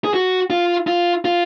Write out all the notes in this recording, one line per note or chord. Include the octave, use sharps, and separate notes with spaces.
G#4
F#4
F4
F4
F4